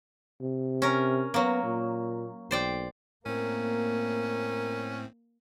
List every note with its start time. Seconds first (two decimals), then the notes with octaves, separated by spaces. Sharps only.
0.41 C3
0.82 C#4 A#4
1.34 F#3 A#3 B3
1.63 A#2
2.51 B1 C5 D5 G5
3.26 A2 A#3 C4 C#4 A#4